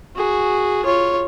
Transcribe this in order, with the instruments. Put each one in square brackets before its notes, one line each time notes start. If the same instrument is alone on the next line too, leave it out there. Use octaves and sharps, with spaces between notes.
[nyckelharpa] F#4 G#4
F4 C#5